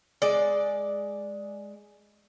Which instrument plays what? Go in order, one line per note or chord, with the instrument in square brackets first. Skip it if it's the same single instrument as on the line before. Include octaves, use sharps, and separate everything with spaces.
[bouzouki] G#3 D5